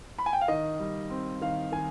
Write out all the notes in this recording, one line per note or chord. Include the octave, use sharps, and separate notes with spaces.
B5
G#5
G5
F5
D#3 D#5
G3
C4
D#3 F5
D#3 G#5